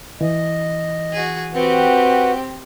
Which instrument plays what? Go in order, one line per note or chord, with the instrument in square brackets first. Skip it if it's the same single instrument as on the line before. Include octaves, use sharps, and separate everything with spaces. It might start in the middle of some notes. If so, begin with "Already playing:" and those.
[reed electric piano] E3 [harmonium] D#5
[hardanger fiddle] F#4 G#4
[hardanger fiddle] C4 G4 [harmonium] F#4 B4 F#5